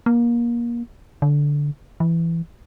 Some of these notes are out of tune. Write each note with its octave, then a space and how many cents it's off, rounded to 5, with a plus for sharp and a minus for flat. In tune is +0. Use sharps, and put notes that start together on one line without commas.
A#3 +25
D3 -10
E3 +15